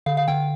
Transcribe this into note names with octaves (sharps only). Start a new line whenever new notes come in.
D3 F5
F5
D3 G5